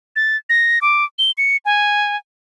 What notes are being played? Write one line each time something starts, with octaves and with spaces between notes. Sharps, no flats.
A6
A#6
D6
G7
C#7
G#5